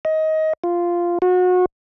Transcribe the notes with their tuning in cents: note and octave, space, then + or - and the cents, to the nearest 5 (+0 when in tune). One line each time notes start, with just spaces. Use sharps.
D#5 +20
F4 -5
F#4 -30